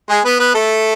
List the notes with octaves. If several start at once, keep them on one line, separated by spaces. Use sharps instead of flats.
G#3 G#4
B3 B4
B3 B4
A3 A4